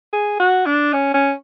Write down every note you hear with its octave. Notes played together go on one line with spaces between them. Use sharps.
G#4
F#4
D4
C#4
C#4